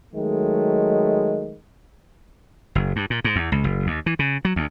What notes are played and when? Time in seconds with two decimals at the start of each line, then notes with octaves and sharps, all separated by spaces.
0.14 D#3 F#3 G#3 A3
2.75 F#1
2.96 G2
3.10 A#2
3.24 G#2
3.36 E2
3.52 C#2
3.64 F#1
3.87 D#2
4.06 E3
4.19 C#3
4.45 F#3
4.56 D2